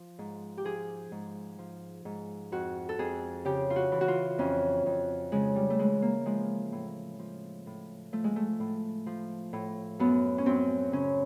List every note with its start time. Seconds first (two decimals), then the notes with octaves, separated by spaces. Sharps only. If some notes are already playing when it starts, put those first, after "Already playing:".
Already playing: F3
0.19 G#2
0.58 G4
0.64 F3 G#4
1.12 G#2
1.58 F3
2.05 G#2
2.52 F2 F#4
2.89 A4
2.99 F2 G#4
3.45 C#3 G4
3.70 F4
3.76 F#4
3.92 E3
4.01 F#4
4.08 F4
4.38 F2 C#4
4.86 F2
5.32 C#3 G#3
5.56 G3
5.70 A3
5.79 E3 G#3
6.02 A#3
6.26 F3 G#3
6.72 A2
7.19 F3
7.66 A2
8.13 F3 A3
8.24 G#3
8.36 A3
8.60 A2
9.06 F3
9.53 A2
9.99 F#2 B3
10.38 C#4
10.46 F#2 C4
10.92 C#3 C#4